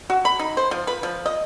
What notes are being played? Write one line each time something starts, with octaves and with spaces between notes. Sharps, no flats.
F#4
B5
D#4
C5
F3
B4
F3
D#5